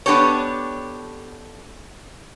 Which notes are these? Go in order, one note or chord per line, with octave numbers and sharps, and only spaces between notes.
B3 D4 G4 A4 C#5